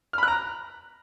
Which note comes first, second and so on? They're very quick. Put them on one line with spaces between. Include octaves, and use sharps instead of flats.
F6 B5 F#6 A#5